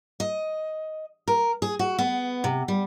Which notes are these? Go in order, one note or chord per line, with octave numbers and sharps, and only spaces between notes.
D#5
A#4
G#4
F#4
B3
C3
G3